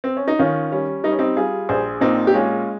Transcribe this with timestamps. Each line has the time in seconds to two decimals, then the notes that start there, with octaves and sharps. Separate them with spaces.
0.04 C4
0.17 C#4
0.28 D#4
0.39 D#3 C#4 F4
0.72 G3 C#4
1.04 G3 D#4
1.12 C#4
1.19 C4 D#4
1.36 G3 F4 G#4
1.69 A#1 G#4 C5
2.01 A#2 C4 D#4
2.27 G4
2.34 G#3 C#4 F4